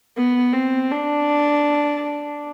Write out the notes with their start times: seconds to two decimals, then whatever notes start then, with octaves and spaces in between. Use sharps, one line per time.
0.17 B3
0.53 C4
0.92 D4